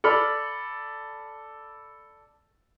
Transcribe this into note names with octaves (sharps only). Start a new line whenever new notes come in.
A4 D5 B5 F6